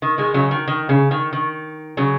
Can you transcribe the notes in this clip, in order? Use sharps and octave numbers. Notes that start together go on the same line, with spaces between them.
D#3
D#3 G#3
C#3 F#3
D#3
D#3
C#3
D#3
D#3
C#3 F#3